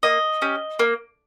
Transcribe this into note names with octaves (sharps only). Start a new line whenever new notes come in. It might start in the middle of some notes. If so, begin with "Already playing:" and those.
A#3 D#5
C#4 G4
A#3